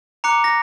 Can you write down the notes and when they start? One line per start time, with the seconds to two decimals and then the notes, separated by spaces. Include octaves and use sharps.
0.24 A#5 D6 F#6 C#7
0.44 A#6